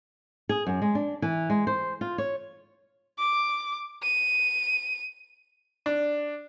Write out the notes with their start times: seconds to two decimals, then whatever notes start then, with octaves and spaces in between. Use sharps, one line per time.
0.49 G#4
0.67 F#2
0.82 G#3
0.95 D4
1.22 E3
1.50 G#3
1.67 C5
2.01 F4
2.18 C#5
3.19 D6
4.03 D#7
5.86 D4